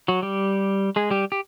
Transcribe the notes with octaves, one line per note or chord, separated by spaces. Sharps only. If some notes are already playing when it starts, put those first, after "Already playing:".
F#3 F#4
G3 G4
G#3 G#4
G3 G4
G4